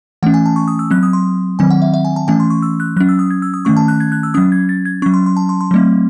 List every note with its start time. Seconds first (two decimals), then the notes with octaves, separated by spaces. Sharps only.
0.23 E3 A3 C#4 F#5
0.34 G#5
0.46 A5
0.56 C#6
0.68 D#6
0.79 E6
0.91 F#3 C4 F#6
1.03 D#6
1.13 C6
1.59 D#3 F#3 C4 G#5
1.70 F#5
1.82 E5
1.94 E5
2.05 G#5
2.16 A5
2.28 E3 A3 C#4 G#5
2.40 C6
2.50 C#6
2.62 E6
2.80 F#6
2.97 F#3 F#6
3.00 C#4
3.09 E6
3.19 D#6
3.31 G#6
3.42 E6
3.54 D#6
3.65 D#3 A3 C#4 C#6
3.77 A5
3.88 F#6
4.00 G#6
4.12 F#6
4.23 E6
4.34 F#3 C#4 D#6
4.52 G#6
4.69 A6
4.85 G#6
5.02 C#4 C#6
5.06 F#3
5.14 C6
5.26 C6
5.37 A5
5.49 C6
5.61 C6
5.71 F#3 A3 C4